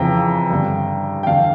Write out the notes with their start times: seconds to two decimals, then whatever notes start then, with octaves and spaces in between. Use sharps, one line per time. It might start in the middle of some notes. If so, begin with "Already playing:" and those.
Already playing: F2 C#3 E3 G5 A#5
0.50 G2 D3
1.23 G5
1.27 E2 D3 F5 A5